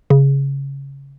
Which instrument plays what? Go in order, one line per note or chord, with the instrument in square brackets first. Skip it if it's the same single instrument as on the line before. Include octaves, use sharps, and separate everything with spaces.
[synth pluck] C#3